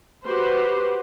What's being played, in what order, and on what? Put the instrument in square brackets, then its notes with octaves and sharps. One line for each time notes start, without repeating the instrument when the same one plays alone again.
[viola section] F#4 G4 B4 C5